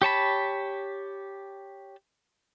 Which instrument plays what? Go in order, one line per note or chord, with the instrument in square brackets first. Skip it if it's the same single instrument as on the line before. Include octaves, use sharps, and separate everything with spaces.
[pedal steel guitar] G4 C#5 A5 B5